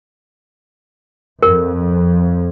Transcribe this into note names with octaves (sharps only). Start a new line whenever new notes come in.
F2 A#4